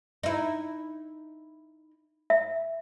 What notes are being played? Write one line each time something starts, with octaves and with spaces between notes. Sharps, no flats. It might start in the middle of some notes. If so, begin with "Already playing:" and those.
D#4 E4
E5